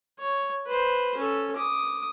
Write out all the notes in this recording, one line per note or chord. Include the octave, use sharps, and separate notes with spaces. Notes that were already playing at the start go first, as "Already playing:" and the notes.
C#5
B4 C5
C#4 A4
D6 D#6